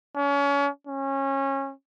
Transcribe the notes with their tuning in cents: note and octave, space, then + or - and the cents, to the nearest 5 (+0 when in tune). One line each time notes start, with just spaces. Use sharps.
C#4 +30
C#4 -25